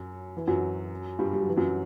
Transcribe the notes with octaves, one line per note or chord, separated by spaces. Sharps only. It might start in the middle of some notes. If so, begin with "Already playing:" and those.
Already playing: F#2 F#3
E3
F#2 F#3
G2 G3
G3
F#3
E3
F#2 F#3